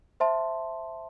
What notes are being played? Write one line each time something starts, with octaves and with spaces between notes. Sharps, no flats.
C5 E5 A5 C6